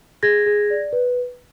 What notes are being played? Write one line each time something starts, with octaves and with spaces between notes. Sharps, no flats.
G#4 G#6 A#6
G#4
D5
B4